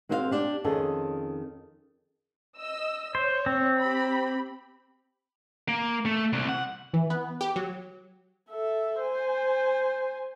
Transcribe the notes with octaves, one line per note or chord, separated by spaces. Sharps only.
G#3 C4 F#4 C5 D5 F5
D4 G4
F2 D#3 C#4 G#4 A4
D#5 E6
C5 C#5
C4
G4 B5
A#3
A3
C2
F#5
E3
B3
G4
F#3
A4 E5
C5 G#5